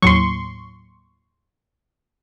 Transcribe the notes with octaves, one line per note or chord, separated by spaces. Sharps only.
D#2 A2 F#3 C6 C#6